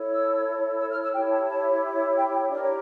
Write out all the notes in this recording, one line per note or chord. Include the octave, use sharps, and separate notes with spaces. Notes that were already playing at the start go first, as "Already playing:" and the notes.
Already playing: E4 A4 C#5
E6
E6
F6
E6
E4 G4 C#5 G5
A5
A5
G5
G5
D4 G4 A#4 C#5 D5
C#5